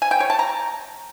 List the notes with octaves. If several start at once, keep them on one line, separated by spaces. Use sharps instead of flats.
G#5
G5
C#5
A5
A#5